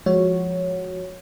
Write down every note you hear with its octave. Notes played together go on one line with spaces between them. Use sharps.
F3 G#3 F#4 C#5